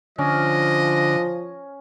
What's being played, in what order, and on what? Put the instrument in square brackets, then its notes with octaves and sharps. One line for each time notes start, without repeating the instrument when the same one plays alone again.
[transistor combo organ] D3 [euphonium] F3 [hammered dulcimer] C#4 [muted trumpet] D#5